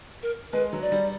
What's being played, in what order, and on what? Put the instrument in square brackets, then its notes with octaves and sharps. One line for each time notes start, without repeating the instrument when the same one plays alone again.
[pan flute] A#4
[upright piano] G#3 [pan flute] B4
[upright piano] F#3
[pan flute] D5
[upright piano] G3